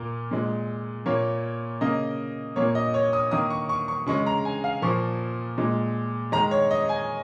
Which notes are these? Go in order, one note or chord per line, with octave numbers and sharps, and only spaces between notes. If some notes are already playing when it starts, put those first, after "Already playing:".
Already playing: A#2 A#3 A#4
A#2 G#3
A#2 A#3 C#5
C#3 A#3 D#5
A#2 A#3 C#5
D#5
C#5
D#6
D#3 A#3 D#6
C#6
C#6
C#6
C#3 G#3 C#6
A#5
G#5
F5
A#2 F3 A#3 C#6
A#2 G#3
D#3 G#3 A#5
C#5
D#5
G#5